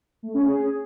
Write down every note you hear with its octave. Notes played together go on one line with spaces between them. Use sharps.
A3
C#4
G#4